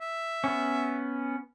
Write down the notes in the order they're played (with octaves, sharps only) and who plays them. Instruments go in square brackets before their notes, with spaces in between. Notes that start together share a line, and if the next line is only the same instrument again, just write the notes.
[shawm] E5
[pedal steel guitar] B3 C#4